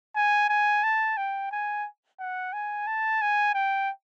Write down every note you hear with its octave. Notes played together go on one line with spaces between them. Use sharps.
G#5
G#5
A5
G5
G#5
F#5
G#5
A5
G#5
G5